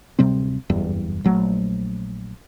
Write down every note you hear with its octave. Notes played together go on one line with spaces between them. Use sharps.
D1 C3 G3 C4
F#1 E2 G2
A#1 F#3 A3